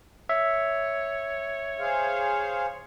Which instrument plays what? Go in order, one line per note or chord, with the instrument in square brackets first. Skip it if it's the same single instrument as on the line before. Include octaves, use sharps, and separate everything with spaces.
[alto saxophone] C#5 [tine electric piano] E5
[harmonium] G#4 C5 F5